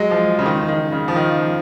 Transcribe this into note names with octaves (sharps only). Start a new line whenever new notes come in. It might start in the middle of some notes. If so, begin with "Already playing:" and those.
Already playing: F#3 G#3
F3
C#3
D#3
D#3
C#3
F3
D#3